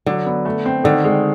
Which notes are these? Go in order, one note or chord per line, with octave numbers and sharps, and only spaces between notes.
D3 F#3
B3
A3
C4
D3 D#3
G#3